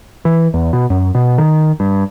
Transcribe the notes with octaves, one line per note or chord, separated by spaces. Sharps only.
E3
E2
B2
F#2
B2
D#3
G2